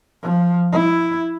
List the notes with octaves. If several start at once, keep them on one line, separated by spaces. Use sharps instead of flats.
F3
E4